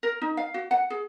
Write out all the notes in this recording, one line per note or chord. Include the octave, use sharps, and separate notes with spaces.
A#4
D#4
F5
F#4
F#5
G#4